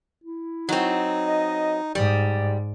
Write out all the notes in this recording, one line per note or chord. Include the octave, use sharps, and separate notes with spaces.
E4
F#3 C4 D#4
D#5
G#2 G3 D5